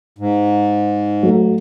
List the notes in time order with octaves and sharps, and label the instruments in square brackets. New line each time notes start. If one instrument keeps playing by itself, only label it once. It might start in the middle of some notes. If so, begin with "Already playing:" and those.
[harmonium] G#2
[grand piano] F#3 A3